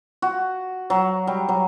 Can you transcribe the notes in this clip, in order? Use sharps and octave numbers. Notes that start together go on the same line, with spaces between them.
F#4
F#3
G3
F#3